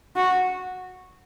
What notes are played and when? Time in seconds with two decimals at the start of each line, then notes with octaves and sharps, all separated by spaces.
0.16 F#4